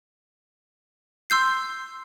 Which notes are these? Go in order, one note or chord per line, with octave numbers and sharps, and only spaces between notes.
C6 E6 G6 C7